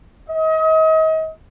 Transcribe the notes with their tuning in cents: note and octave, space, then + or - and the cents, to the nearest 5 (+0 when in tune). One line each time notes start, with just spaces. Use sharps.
D#5 +35